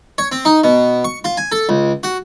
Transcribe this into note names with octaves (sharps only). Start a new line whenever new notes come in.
C#5
C4
D#4
B2
C#6
F4
G#5
A4
C#2
F#4